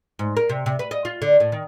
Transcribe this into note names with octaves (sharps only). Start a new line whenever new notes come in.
G#2
A#4
C3
C3
B4
D#5
F4
D3
A2
D#3